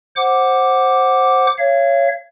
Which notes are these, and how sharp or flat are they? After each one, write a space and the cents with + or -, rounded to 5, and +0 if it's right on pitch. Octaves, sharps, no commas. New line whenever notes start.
C5 +10 F#5 +0 D6 +0
C#5 +0 F5 -40